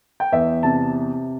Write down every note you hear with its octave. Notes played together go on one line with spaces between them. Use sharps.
G5
E2 E5
C3 A5